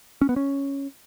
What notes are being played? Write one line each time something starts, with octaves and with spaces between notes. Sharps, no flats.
C#4
B3
C#4